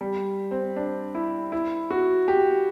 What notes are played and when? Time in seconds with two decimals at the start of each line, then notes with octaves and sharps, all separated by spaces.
0.01 G3
0.51 C4
0.76 D4
1.15 E4
1.52 E4
1.91 F#4
2.28 G4